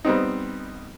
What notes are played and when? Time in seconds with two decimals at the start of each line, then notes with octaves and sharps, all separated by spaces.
0.05 G3 B3 C4 D#4